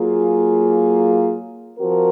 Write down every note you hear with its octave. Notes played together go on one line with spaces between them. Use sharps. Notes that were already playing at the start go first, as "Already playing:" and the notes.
Already playing: F#3 A#3 F4 G#4
F3 C4 F#4 A#4